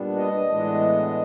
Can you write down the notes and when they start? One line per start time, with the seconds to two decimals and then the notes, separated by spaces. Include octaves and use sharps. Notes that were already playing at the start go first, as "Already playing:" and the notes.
Already playing: A#2 G3 B3 D4
0.16 D#5
0.48 A2 E3 G#3 B3 D4